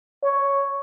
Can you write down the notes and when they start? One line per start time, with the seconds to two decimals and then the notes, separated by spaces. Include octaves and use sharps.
0.24 C#5